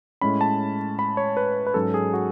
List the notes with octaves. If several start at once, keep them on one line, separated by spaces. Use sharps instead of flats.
A2 G#3 C#4 B5
A5
B5
C#5
B4
B4
G#2 F#3 C#4 A4
G#4
F#4